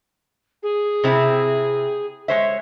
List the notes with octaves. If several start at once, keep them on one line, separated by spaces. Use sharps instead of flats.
G#4
C3 C4 E4
G#3 C5 C#5 E5